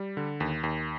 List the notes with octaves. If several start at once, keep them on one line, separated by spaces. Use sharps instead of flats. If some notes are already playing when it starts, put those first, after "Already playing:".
Already playing: G3
D3
D#2
D#2